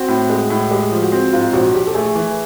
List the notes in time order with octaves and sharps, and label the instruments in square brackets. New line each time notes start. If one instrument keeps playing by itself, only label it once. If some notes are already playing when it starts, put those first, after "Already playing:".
Already playing: [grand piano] C4 [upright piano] F#4
[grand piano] A2
G#3
A2
[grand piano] G#3 [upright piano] G4
[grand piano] F3
[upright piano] F#4
[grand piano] C4
[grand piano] G#2 [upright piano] F4
[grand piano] A#1 [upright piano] F#4
[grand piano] A#1 [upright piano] G4
[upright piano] A4
[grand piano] A3 [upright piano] G#4
[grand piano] E3